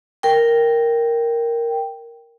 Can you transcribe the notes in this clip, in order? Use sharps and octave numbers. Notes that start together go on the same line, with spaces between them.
A#4 G5